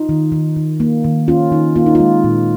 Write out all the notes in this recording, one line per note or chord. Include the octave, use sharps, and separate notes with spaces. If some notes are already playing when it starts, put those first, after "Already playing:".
Already playing: D#4 F4
D#3
D#3
D#3
A#3
D#3
C#4 F4
D#3 D#4
A#3 F4
D#4
G#3 F4
A#2